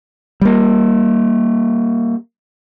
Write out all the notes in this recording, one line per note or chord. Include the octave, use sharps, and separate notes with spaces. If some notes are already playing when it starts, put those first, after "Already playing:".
G3 A#3